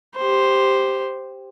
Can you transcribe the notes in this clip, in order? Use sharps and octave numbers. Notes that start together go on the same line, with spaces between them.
G4 C5